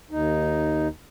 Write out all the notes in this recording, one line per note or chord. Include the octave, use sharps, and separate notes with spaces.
D#2 D#4